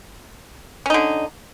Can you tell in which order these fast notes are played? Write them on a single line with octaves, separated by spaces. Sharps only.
C#4 D#4 D3